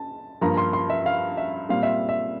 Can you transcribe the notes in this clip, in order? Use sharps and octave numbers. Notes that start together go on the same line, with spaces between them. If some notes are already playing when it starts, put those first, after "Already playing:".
Already playing: A5
G2 F3 A#3 A#5
C6
C6
E5
F5
E5
A#2 G3 C4 F5
E5
E5